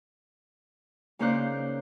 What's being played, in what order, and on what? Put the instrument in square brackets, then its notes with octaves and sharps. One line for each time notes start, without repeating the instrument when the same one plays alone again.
[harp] C#3 A#3 D#4 C5 D5 F#6